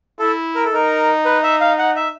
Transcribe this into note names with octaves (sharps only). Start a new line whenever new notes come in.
E4 A4
A#4
A4
D#4 A#4
B4
E5
F5
F#5
E5